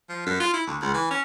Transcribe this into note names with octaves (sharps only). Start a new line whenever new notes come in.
F3
F#2
F4
E4
D2
C#2
E3
C#4